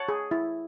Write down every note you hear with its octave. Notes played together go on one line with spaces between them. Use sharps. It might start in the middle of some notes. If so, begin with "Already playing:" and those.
Already playing: C#5 F#5 A5
G#4
E4